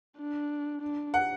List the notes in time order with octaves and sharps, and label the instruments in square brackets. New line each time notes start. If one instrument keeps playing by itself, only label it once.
[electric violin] D4
D4
[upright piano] F#5